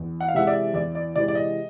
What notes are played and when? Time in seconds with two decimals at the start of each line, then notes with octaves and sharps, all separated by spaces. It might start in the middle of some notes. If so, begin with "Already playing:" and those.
Already playing: E2
0.20 F#5
0.28 F5
0.34 C3 E3 G#3 E5 F#5
0.47 D5 E5
0.74 E2 D5
0.95 D5
1.16 C3 E3 G#3 D5
1.28 D5
1.35 D#5